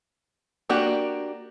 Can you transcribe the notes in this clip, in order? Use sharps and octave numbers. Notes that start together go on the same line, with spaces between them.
A#3 D4 F#4 G4